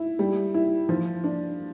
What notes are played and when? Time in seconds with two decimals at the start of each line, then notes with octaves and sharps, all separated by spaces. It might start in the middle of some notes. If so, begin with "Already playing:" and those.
Already playing: E4
0.19 G3
0.54 E4
0.89 F3
1.24 D4